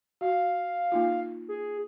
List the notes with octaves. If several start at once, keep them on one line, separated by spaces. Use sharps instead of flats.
F#4 F5
A#3 D#4 F4
G#4